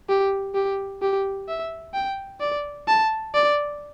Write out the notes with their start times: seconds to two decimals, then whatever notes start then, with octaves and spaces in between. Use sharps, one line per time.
0.09 G4
0.54 G4
1.02 G4
1.48 E5
1.94 G5
2.40 D5
2.88 A5
3.34 D5